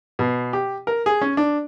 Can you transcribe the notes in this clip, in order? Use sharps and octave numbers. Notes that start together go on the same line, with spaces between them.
B2
G4
A#4
G#4
C#4
D4